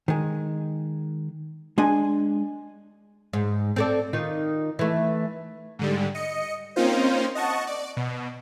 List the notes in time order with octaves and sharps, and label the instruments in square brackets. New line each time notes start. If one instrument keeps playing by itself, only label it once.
[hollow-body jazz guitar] D#3 G#3
G#3 D4 G#5
[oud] G#2
C4 A4 D5
D#3 D#4 F4
E3 A3
[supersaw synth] G#2 D3 G3
D#5 C#7
A#3 C4 C#4 D#4 F4 C5
D#5 F#5 A5 C#6
D5
B2